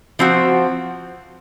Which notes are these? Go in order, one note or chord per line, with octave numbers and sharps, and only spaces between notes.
F3 C4 F#4